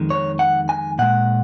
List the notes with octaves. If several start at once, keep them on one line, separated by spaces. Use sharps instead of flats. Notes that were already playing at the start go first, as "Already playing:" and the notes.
Already playing: F2 D#3 G#3
C#5
F#5
G#5
A#2 G#3 F#5